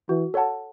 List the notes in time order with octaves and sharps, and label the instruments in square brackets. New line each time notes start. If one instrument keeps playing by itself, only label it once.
[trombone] E3 [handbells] F#4
[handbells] A4 C#5 F#5 A5